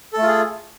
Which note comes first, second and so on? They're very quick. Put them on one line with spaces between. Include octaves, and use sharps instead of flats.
A4 A3 F4 G#4